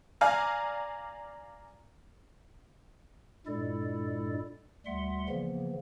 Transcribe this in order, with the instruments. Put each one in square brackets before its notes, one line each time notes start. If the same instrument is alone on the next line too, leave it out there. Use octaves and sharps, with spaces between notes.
[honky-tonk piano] D5 F5 G#5 A#5 F6
[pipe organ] G2 A#2 G#3 E4 A4 D5
D2 G3 E5 F#5 C6
C#3 E3 F3 A#3 B3